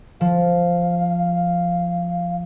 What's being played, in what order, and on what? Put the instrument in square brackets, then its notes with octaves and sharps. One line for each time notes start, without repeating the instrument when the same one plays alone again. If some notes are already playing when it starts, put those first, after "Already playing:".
[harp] F3 [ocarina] F5